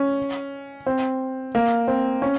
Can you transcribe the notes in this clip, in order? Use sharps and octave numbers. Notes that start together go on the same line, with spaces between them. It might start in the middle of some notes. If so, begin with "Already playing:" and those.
Already playing: C#4
C4
A#3
C4
C#4